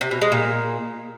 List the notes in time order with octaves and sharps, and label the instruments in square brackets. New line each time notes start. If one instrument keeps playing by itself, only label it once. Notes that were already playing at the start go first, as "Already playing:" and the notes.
[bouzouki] C3
B2
G#3
A#2